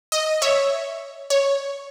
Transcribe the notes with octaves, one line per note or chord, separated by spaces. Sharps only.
D#5
C#5 E5
C#5